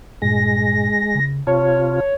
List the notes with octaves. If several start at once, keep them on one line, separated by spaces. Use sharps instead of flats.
G2 A#2 G#3 A#6
C#3
C3 F4 C#5 A5